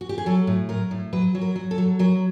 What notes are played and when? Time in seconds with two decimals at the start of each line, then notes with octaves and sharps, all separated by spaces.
0.01 F#4
0.09 G4
0.18 G#4
0.26 F#3 A4
0.47 A2
0.69 F#3 A#4
0.91 A2
1.13 F#3 B4
1.35 F#3
1.41 A#4
1.56 F#3
1.71 A4
1.78 F#3
1.99 F#3 A#4